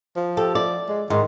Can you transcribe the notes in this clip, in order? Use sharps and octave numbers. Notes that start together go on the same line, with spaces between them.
F3
G4 A4
D5
G#3
G#2 D#3